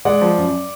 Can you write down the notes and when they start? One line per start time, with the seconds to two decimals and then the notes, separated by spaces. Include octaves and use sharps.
0.05 G#3 D5 F#5
0.21 F3
0.37 F#2